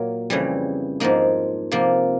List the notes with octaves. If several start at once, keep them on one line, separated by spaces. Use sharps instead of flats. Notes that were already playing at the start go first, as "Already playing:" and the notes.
Already playing: A#2 F#3 A#3
F2 C#3 E3 G3
G#2 F3 A#3 D#4
C3 F3 A#3